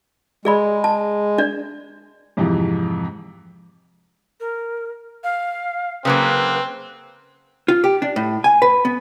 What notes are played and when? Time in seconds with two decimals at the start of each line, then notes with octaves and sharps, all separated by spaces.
0.45 G#3 G#4 D5 B5
0.84 A5
1.38 D4 D5
2.37 F2 G#2 C3 E3 F3
4.40 A#4
5.24 F5
6.05 C#3 F#3 A#3 C4 B4
7.68 F4
7.84 G4
8.02 D4
8.16 A2
8.44 G#5
8.62 B4
8.85 B3